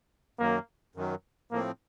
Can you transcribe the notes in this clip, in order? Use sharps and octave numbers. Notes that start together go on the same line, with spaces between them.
F#2 D#3 F#3 A#3
F#2 D#3 F#3
A2 F3 A#3 C4